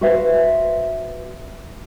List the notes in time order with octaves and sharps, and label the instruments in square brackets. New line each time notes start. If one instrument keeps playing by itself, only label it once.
[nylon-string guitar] F#4 B4 C5 E5 F5